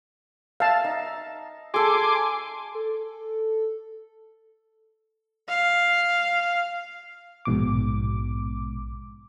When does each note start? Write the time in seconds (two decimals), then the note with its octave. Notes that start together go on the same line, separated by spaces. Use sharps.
0.60 E5 F5 A5
0.84 D#4
1.74 G#4 A4 G#5 C6 D6
2.75 A4
5.48 F5
7.45 A#1 G#2 B2 D6